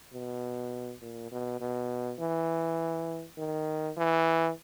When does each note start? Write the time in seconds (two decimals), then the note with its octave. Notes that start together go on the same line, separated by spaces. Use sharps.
0.13 B2
1.02 A#2
1.31 B2
1.60 B2
2.19 E3
3.38 D#3
3.97 E3